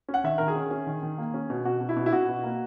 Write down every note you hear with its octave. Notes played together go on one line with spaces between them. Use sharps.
C#4
F#5
D#3 E5
D#3 A#4
G#4
C#4
C#4
D#3
D#3
A#3
C#4
B2
B2 F#4
B2
E4
B2
E4
B2 F#4
B2
A#3